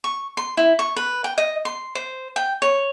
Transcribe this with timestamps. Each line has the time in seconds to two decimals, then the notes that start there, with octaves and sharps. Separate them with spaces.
0.04 C#6
0.37 C6
0.57 E4
0.79 C#6
0.96 B4
1.24 G5
1.38 D#5
1.65 C6
1.95 C5
2.36 G5
2.62 C#5